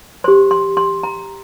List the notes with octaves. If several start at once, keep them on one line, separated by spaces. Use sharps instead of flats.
G4 C5 C6
C6
C6
A#5